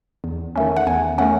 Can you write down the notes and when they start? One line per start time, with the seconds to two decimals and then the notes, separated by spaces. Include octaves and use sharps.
0.24 E2
0.56 D#3 A3 C#4
0.77 F#5
0.87 E2 G#5
1.18 D#3 A3 C#4 F#5